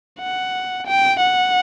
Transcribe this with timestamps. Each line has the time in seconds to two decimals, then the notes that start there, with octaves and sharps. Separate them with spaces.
0.20 F#5
0.87 G5
1.22 F#5